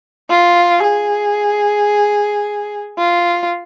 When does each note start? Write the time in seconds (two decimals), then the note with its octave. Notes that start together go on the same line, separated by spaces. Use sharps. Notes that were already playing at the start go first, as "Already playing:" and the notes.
0.30 F4
0.83 G#4
2.98 F4